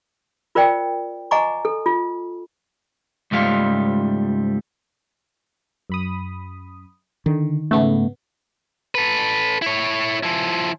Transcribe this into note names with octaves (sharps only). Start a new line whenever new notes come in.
F4 A#4 C5 D5 G5
D#5 F#5 G#5 A#5 C#6 D6
A4
F4
C#2 G#2 F3 G3 A3 F5
F#2 B5 D#6
D3 D#3
G#2 C#3 A3 B3
A4 B4
E4 C#5
F3 E4